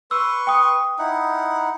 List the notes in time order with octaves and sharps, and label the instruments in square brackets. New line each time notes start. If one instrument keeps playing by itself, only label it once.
[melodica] B4 C6 C#6 [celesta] E6
[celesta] G5 D#6
[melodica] D#4 E4 F#5